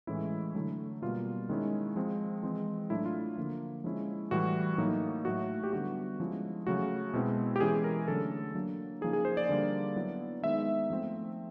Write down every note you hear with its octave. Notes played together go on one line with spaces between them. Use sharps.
A2 E3 G#3 C#4 E4
D3 F#3 A3
B2 G3 A#3 F4
D#3 G#3 C#4 E4
F3 G#3 C4
E3 G#3 C4
A2 F#3 A3 D4 E4
F4
D3 F3 A#3
F3 G#3 C#4 E4
A2 E3 G3 F#4
A2 F#3 A#3 D#4
A2 F#3 A3 F#4
G4
D3 G3 B3 F#4
F3 G#3 C#4 E4
C#3 F#3 A3 F#4
B2 G#3 C4 E4
G4
E3 G#3 C#4 E4 G#4
A#4
D3 F#3 A3 C#4 A4
F#3 A#3 D4
C#3 F3 A#3 D#4 G#4
G#4
C5
D5
D3 G3 A#3
F#3 B3 E4
D#3 G#3 B3 D#4 E5
F3 A3 C4